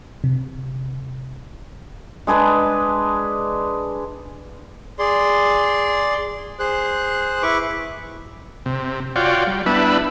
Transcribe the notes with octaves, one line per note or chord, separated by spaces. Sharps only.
C3
G#3 D4 G#4 B4
G#4 D5 C6
G#4 C5 F#6
E4 B4 C#6 D6
C3
F4 F#4 C#5 D5 G5
G3
G3 B3 D4 E4 B4 E5